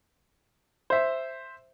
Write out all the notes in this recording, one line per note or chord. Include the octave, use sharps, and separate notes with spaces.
C5 E5